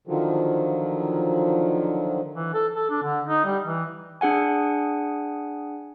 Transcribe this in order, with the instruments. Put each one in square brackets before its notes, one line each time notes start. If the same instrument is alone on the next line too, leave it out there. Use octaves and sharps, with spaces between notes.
[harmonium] D3 D#3 F3 F#3
[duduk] E3
A4
A4
D4
D3
D#4
G3
E3
[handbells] D4 G#4 F#5 G#5